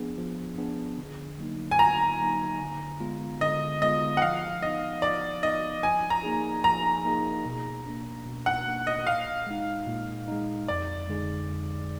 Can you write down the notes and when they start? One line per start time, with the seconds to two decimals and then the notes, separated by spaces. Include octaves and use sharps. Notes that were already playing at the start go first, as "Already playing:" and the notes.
Already playing: F3 B3 D4 G#4
0.18 F3
0.58 B3 D4 G#4
0.98 D3
1.38 F#3 A#3 D#4
1.71 G#5
1.79 D3 A#5
2.20 F#3 A#3 D#4
2.60 D3
3.00 G#3 B3 F4
3.41 D3 D#5
3.82 G#3 B3 F4 D#5
4.17 F#5
4.22 F3 F5
4.62 B3 D#4 D#5
5.02 F3 D5
5.43 B3 D#4 D#5
5.83 F3 G#5
6.10 A#5
6.23 A#3 D#4 G#4
6.64 F3 A#5
7.05 A#3 D#4 G#4
7.45 B2
7.86 A#3 D4
8.26 B2
8.46 F#5
8.67 A#3 D4
8.87 D#5
9.07 A#2 F5
9.47 G#3 D#4
9.87 A#2
10.28 G#3 D#4
10.68 F2 D5
11.09 D3 G#3 D#4 G#4
11.49 F2